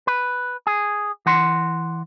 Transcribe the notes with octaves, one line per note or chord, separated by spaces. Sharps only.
B4
G#4
E3 F#5 C6